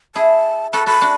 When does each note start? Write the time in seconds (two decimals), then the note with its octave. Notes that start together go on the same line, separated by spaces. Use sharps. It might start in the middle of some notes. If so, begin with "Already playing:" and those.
0.15 E4 G#4 A5
0.73 F#4 A4 B5
0.86 F#4 A4 B5
1.01 D4 F#4